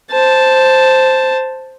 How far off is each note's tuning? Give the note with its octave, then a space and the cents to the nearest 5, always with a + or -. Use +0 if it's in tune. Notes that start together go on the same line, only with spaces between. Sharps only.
C5 +0 A5 +0